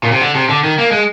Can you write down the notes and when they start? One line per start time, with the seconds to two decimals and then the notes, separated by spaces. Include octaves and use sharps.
0.03 A#2
0.12 C3
0.21 D3
0.35 C3
0.49 D3
0.64 D#3
0.78 A#3
0.92 G#3